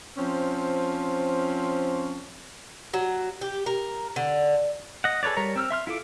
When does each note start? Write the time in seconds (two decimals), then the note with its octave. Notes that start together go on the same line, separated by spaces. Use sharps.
0.17 F3 C4 C#4
2.94 F#3
3.41 G4
3.66 A#4
4.16 D3
5.04 D#5 F#5
5.23 G#4 A4 B4 C#5 D5
5.37 G3 A#4 C#5 A#5
5.56 C4 E6 F6
5.70 E5 C6 F6
5.87 E4 F4 A4 D6